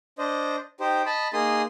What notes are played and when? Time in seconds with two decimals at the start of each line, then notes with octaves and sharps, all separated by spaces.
0.18 D4 C5 D#5
0.80 D#4 G4 C5
1.06 D#5 A5 B5
1.33 A#3 D#4 G#4 C6 D#6